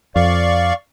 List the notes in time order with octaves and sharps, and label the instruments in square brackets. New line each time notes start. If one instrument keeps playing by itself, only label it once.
[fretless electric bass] F2 [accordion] D5 F5 C#6